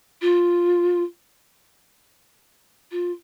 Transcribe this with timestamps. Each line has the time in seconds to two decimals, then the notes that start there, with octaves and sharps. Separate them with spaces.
0.21 F4
2.91 F4